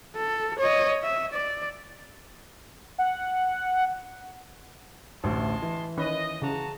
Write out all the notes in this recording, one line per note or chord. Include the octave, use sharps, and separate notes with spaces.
A4
C#5 D#5
E5
D5
F#5
A1 D2 G#3 A5 C6
E3
D#3 C#4 B4 D#5
C#3 F#4 A5 A#5